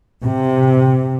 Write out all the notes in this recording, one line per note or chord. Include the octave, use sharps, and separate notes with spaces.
C3